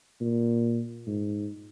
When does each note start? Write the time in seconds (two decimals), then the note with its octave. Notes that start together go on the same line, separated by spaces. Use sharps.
0.20 A#2
1.07 G#2